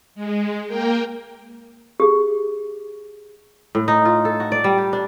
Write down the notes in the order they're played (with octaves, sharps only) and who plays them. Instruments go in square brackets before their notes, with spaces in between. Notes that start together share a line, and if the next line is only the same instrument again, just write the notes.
[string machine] G#3
A#3 A#4 G5
[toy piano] G4 G#4
[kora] A2
D#4
F4
A4
F#4
D5
G3
G4
D4